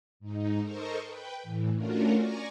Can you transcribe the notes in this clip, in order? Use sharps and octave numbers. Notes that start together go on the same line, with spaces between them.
G#2 D#4
A4 A#4 C5 D#5 C#6
B4 G5
A2 E3
A3 C#4 D4 F4 F#4 A#4
D5 G#5 A#5 C#6